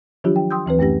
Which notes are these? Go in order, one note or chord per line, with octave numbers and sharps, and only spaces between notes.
D#3 F3 F#3 D4 F4 G4
G5
G5 C6 D#6 E6 G6
D2 E3 C4 B4
F#2 A3 C#4 G4 A#6